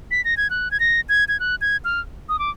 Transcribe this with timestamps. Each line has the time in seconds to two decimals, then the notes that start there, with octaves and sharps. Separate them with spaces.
0.11 B6
0.25 A#6
0.37 G#6
0.50 F#6
0.71 G#6
0.80 A#6
1.09 G#6
1.28 G#6
1.40 F#6
1.61 G#6
1.85 F6
2.29 D#6
2.39 D6